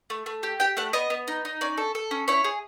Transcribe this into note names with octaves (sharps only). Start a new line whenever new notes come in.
A3
A3
G4
G4 G5
A3 F#5
B3 D#5
B3
D#4
D#4
C#4 D5
A4
A4
C#4
E4 C#5
G#4